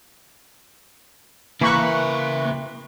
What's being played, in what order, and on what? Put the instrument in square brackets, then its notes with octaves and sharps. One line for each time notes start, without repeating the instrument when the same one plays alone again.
[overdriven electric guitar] C#3 E5 [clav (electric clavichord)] E3 A#5 [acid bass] A#3 [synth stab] B5 C#6 F#6